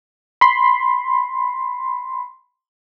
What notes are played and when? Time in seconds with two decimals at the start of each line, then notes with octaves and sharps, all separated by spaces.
0.41 B5 C6